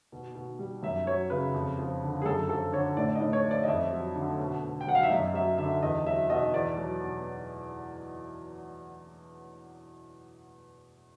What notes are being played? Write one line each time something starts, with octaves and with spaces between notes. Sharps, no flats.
B2
B2
G3
F#2 E5
F#3 C#5
C#3 B4
F2
F3
D3
G#4
F#2 A4
F3 A4
D3 C#5
A2 D5
D#5
A2
C#5
F3
D5
D#5
F2 E5
F#3
D3
B2
B2
G5
F#3 F#5
F5
E5
F#2 D#5
F#3 E5
D3 E5
E2 D#5
F#3 E5
B2 D#5
E2 D5
F#3
B2